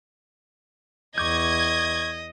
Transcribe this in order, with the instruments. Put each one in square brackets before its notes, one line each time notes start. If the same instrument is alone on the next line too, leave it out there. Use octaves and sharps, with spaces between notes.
[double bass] E2 [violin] D#5 [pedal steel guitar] C#6 D6 G6 [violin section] G#6